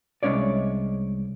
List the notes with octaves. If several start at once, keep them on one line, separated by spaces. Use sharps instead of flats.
C2 G#3 C#4 C#5 D5